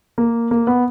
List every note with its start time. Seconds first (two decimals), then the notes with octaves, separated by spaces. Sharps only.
0.18 A#3
0.51 A#3
0.67 B3